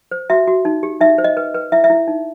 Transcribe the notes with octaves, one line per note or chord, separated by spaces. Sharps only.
C5
F#4 E5
F#4
D#4
G4
D#4 E5
C5
D#5
B4
B4
E4 E5
E5
E4
D#4